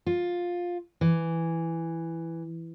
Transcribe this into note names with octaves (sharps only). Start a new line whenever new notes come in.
F4
E3